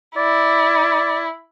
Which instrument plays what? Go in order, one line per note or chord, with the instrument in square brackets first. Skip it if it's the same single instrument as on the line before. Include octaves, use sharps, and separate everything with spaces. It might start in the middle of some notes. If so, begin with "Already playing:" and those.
[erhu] E4 [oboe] D5